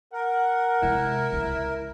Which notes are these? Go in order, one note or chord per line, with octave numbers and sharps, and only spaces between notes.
A#4 F#5
C3 G#3 E4
C#2